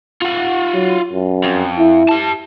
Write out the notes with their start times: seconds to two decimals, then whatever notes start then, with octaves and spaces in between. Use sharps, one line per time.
0.22 F4 F#5
0.74 F#3
1.13 F#2
1.44 F2
1.78 E4
2.09 G4 A5